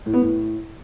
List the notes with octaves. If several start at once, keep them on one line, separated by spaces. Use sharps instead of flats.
A2
B3
A2